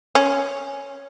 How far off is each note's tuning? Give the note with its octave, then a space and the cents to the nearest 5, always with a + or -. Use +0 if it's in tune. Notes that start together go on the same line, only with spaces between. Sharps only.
C#4 +5